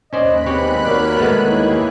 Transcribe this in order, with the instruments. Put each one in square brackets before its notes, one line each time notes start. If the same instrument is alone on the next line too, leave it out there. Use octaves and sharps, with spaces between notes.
[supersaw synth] D#2 B5 F#6 [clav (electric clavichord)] C#4 C5 D5 [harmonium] D#5
[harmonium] G#3 B3 [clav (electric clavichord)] C4 G4 C#5
[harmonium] F#4 C#5 F5 [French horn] A#4 [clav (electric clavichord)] D5
[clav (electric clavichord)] G#3 A3 B3
[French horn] D#3 [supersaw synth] A#3 G4 G#4 [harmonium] E4 C#5